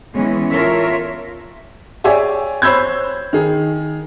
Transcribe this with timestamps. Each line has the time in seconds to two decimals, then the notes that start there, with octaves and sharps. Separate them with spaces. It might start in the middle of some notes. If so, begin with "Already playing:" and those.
0.15 E3 G#3 B3 C#4
0.52 F4 A4 A#4 C#5 E5
2.04 G4 G#4 C#5 D5 E5 G#5
2.62 C5 C#5 B5 E6 G6 G#6
3.33 D#3 G#4